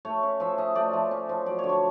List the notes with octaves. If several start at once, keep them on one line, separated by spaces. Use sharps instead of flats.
A3 C#5
C#4
F3 E5
C#4 D#5
A3 D5
F3
C#4
F3
F#3 D5
D3 C#5
C#5